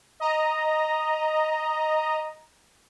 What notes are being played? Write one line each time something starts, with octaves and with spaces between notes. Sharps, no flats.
D#5 A#5